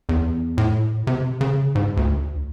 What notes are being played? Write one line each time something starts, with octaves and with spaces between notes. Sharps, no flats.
E2
A2
C3
C#3
G#2
D2